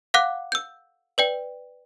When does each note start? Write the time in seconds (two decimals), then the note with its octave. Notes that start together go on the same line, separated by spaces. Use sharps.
0.14 F5 F#5 D6 F#6
0.52 E6 G6
1.18 B4 D5 G5